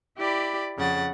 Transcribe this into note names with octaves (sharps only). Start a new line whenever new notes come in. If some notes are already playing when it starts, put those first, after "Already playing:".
E4 G4 D5 B5
F2 C#3 F#5 A6